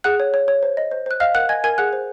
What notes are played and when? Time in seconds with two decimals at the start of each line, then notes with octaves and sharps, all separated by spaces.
0.04 G#4 F#5 F#6
0.20 C#5
0.34 C#5
0.48 C#5
0.63 C5
0.77 D#5
0.91 C5
1.06 C5 F#6
1.20 D#5 F5 F6
1.35 A#4 F#5 F#6
1.49 D#5 G#5 G#6
1.64 A#4 G#5 G#6
1.78 G#4 F#5 F#6
1.93 C5